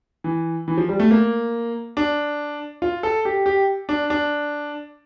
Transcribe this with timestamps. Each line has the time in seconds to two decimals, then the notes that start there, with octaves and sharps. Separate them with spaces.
0.24 E3
0.68 E3
0.77 F3
0.89 G3
1.00 A3
1.11 A#3
1.97 D4
2.82 F4
3.03 A4
3.25 G4
3.46 G4
3.89 D4
4.10 D4